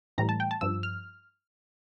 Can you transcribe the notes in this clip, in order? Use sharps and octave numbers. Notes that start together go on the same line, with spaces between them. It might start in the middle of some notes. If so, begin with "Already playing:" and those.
A2 E3 G3 A#5
A5
G5
A5
G2 F3 E6
F6